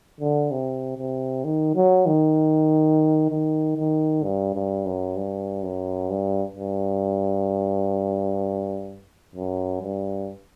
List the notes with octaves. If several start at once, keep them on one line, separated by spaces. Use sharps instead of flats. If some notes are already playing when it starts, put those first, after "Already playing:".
D3
C3
C3
D#3
F#3
D#3
D#3
D#3
G2
G2
F#2
G2
F#2
G2
G2
F#2
G2